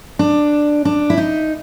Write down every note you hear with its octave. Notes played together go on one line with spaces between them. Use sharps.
D4
D4
E4
D#4